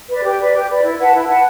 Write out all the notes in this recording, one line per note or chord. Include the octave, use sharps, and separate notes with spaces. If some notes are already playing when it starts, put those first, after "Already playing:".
B4 D5
G4
B4 D5
G4
B4 D5
E4
B4 F#5 A5
E4
B4 F#5 A5